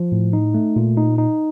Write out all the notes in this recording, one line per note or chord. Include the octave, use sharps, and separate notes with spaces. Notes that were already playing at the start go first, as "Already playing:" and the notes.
Already playing: F3
A2
D#4
A3
A#2
D#4
D#4